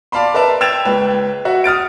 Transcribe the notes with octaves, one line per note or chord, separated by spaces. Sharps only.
D5 F5 A5 B5 C6
A#4 B4 E5 A5
G5 E6 G#6 A6 E7 F7
C#2 B4
F#4 E5 F#5
D#6 F6 A6 D7